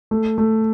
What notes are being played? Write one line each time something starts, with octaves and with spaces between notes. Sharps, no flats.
A3
A3